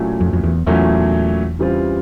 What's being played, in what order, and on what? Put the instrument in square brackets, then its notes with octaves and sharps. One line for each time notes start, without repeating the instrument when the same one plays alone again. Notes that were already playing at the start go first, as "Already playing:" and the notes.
Already playing: [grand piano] A#2 F#3 A3 C#4 E4
[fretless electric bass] F2
F2
E2
[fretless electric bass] E2 [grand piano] A#2 F#3 A3 C#4 E4
[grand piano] C#3 E3 G3 C4 F4